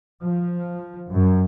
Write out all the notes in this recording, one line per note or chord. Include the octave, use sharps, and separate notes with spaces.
F3
F#2